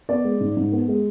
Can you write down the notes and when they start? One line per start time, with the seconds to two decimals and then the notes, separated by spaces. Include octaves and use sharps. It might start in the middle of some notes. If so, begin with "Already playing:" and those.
0.09 B3 D5
0.24 G#3
0.40 G#2
0.57 G#2
0.72 B3
0.88 G#3